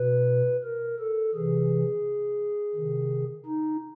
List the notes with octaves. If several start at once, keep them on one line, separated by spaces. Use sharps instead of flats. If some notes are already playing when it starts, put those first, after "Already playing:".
Already playing: B2 B4
A#4
A4
C3 E3 G#4
C3 D#3
D#4